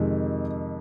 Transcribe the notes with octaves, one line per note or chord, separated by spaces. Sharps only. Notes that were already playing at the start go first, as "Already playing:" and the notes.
Already playing: F2 C3 D#3 G#3